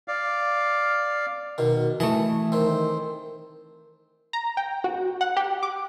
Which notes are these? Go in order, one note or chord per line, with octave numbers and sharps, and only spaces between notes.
D5 F5
B2 D#3
E3 A3 D#5 A5
D#3 C4
A#5
G5
F#4
F#5
G4
D6